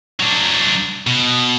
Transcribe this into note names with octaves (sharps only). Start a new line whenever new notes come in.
F#3 D4
B2